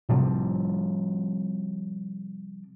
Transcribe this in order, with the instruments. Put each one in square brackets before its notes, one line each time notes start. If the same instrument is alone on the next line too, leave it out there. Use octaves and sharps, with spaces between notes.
[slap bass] C3 F3 G3 C4